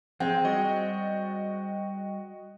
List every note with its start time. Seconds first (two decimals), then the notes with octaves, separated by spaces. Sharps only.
0.20 F3 G#3 C4 C5 G5
0.45 G3 F#4 D5 D#5